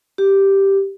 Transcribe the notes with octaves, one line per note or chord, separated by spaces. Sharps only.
G4